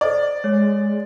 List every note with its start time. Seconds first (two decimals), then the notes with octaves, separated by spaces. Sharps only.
0.01 A4 C5 D5 D#5
0.44 G#3 C#5